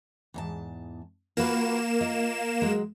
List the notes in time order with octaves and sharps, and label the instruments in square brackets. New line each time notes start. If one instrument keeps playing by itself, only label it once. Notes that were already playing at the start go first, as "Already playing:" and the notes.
[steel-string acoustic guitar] E2 G#2 A5
[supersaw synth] A#3 E7 [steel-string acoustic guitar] F4 F#4 B4
[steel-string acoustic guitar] F4 D#5
F#3 G#3